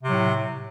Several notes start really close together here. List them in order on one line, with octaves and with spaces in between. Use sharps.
C3 F#3 A2